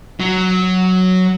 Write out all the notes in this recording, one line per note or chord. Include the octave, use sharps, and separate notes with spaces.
F#3